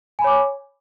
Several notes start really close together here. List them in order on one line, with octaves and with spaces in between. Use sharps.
G#5 B5 C#5 D6